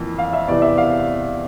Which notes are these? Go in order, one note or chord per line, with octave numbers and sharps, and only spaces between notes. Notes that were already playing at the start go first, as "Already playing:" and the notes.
Already playing: F2 E3 A#3
F5
E5
E2 C3 E3 D5
E5
F5